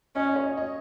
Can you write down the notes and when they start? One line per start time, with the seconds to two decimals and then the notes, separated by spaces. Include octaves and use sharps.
0.16 C#4 D#5
0.29 D#5
0.36 C#5
0.43 D#5
0.57 D#5